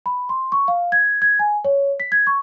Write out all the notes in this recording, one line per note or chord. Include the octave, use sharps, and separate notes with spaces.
B5
C6
C#6
F5
G#6
G#6
G#5
C#5
B6
G#6
C#6